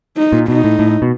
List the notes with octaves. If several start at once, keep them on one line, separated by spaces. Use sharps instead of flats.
D#4
A#2
B2 D#4
A2
A2
B2